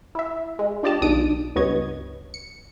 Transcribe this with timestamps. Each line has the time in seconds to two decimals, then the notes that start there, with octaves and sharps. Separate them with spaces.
0.15 E4 E5
0.59 G#3
0.83 D4 F4 G4 D5 D#5 A5
1.02 B1 D#3 D4 D#6 D7
1.56 C#2 G2 B3 C#5 D#5 G#6
2.34 C#7